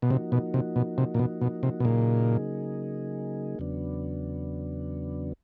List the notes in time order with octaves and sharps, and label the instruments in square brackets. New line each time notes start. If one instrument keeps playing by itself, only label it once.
[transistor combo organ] B2
[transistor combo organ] C3 [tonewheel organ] F3 A#3 D#4 F#4
[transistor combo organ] B2
C3
B2
C3
A#2
B2
B2
C3
B2
[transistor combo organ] A#2 [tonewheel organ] C#3 F#3 A#3 D#4 G#4
[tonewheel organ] E2 C#3 F#3 B3 D4